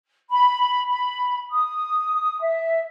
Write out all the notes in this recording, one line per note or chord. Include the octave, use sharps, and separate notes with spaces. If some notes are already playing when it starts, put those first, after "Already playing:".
B5
B5
D#6
E5